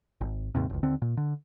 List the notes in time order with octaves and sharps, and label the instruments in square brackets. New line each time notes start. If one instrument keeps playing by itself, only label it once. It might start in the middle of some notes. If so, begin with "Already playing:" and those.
[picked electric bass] G#1
D#2 G#2 C3
F#1 C#2
D#2 D3 C4
A#2
D3